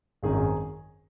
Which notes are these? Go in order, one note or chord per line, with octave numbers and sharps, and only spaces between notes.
G#1 F#2 D#3 G#3 C4 G#4